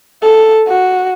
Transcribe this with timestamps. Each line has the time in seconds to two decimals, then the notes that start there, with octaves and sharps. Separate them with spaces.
0.23 A4
0.67 F#4